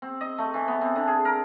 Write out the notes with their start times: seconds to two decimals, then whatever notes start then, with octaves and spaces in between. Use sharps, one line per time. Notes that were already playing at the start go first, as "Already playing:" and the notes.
0.02 C4
0.21 D#5
0.38 A3
0.54 E3
0.68 B3
0.81 C4
0.96 D3
1.08 G#4
1.25 A#4